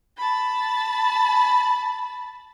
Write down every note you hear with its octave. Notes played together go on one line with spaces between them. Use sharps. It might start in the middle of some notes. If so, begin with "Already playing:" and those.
A5 B5